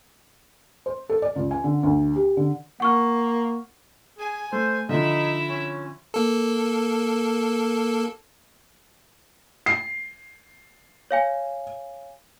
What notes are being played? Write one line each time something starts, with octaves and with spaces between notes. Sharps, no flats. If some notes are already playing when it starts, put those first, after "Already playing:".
C5
A4
D5
C#2
G#5
D3
D2
G4
D3
A#3 F#5 C#6 F6
G#4 G#5
A3 C5
D3 F3 D#4 E4 E5
C#4
A#3 A4
C7
C#5 F5 G#5